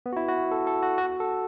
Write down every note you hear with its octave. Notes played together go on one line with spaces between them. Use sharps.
B3
F#4
E4
F#4
A4
A4
F#4
F#4
A4